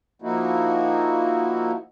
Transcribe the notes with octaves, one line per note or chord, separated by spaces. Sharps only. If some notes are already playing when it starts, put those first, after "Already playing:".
F3 A#3 D#4 E4 F#4